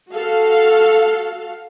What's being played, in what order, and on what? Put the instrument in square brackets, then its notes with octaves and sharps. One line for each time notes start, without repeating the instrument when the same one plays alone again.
[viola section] F#4 A4 F5